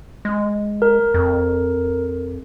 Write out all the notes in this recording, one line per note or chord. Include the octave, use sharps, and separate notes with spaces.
G#3
A#4
F2